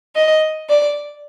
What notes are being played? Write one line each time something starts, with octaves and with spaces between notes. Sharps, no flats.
D#5
D5